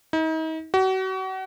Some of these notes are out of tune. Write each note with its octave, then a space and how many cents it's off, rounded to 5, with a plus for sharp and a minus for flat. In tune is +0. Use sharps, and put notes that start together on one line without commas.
D#4 +40
F#4 +35